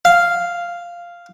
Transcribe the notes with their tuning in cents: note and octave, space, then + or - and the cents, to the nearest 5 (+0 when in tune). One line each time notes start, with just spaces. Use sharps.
F5 -5